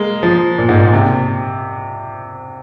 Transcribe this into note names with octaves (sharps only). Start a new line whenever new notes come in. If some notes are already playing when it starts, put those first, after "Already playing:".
Already playing: G#3 A#3
F3
A#2
G#2
A#2
C3